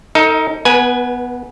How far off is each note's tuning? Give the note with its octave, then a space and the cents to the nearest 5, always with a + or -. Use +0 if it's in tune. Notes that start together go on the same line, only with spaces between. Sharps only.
D#4 +15 A4 +45 D#5 +45
B3 +0 B4 -30 G#5 +10